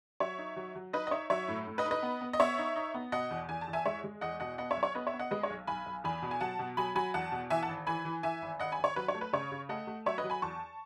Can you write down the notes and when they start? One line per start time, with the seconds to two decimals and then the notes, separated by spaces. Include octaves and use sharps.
0.20 F#3 C#5 E5
0.38 D#4
0.56 F#3
0.76 F#3
0.93 D#4 B4 D#5
1.07 D#5
1.11 D#4 C#5 E5
1.30 F#3 C#5 E5
1.48 A2
1.67 A2
1.78 B4 D#5
1.85 D#4
1.91 B4 D#5
2.02 B3
2.21 B3
2.33 D#5
2.39 B3 C#5 E5
2.58 D#4
2.76 D#4
2.94 B3
3.12 B2 D#5 F#5
3.31 E2
3.49 E2 G#5
3.61 A5
3.68 E2
3.73 E5 G#5
3.85 G#3 C#5 E5
4.04 G#3
4.21 E2 D#5 F#5
4.40 B2 D#5 F#5
4.58 B3 D#5 F#5
4.70 C#5 E5
4.77 B1
4.83 C#5
4.95 B3 B4 D#5
5.07 C#5 E5
5.13 B3
5.19 D#5 F#5
5.31 G#3 B4 D#5
5.43 C#5
5.50 B1
5.67 B1 G#5 B5
5.86 B1
6.04 E2 G#5 B5
6.22 B2
6.31 G#5
6.40 F#3 F#5 A5
6.59 B2
6.77 F#3 G#5 B5
6.95 F#3 G#5 B5
7.14 E2 F#5 A5
7.32 B2
7.50 E3 E5 G#5
7.62 F#5 A5
7.68 G#1
7.87 E3 G#5 B5
8.05 E3
8.23 E3 E5 G#5
8.42 G#1
8.59 G#1 D#5 F#5
8.72 G#5 B5
8.79 G#1
8.84 C#5
8.96 F#3 B4
9.08 C#5
9.14 A3
9.21 B4
9.33 C#3 C#5
9.52 C#3
9.69 A3 D#5 F#5
9.87 A3
10.06 F#3 C#5 E5
10.18 B4 D#5
10.24 F#3
10.30 G#5 B5
10.42 E2 A5 C#6